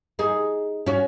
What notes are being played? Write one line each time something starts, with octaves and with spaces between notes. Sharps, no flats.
D#4 G#4
C#4 F#4